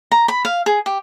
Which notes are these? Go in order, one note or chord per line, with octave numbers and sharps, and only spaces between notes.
A#5
B5
F5
G#4
G4